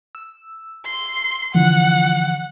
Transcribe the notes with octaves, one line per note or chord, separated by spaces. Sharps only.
E6
C6
D3 E3 F3 F#5